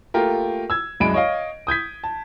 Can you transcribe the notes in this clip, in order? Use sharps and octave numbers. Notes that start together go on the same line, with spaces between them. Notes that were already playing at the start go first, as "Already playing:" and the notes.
A3 A#3 F4 G4 A#4
E6 G#6
C2 F#2 G#3 B5 D7
C#5 D#5 F5
D#6 G6 G#6 B6
A5